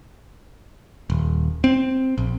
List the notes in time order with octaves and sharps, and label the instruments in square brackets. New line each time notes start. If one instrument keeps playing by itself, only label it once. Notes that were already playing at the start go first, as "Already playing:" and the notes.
[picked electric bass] D#1
C4
A#1